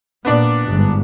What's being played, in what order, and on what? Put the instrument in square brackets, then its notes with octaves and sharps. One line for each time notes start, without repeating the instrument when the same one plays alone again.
[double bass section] A#2 [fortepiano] B3 D4 D5
[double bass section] G1 G#2